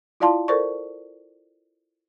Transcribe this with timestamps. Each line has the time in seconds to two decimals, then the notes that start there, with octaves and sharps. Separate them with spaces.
0.20 E4 F4 D5 F5 A5 C6
0.48 A4 A#4 C5 D5 C#6